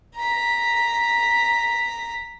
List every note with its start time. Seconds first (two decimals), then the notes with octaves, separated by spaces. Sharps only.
0.16 A#5 B6